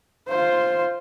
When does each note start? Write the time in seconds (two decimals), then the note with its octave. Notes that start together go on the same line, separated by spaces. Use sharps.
0.28 F4 C5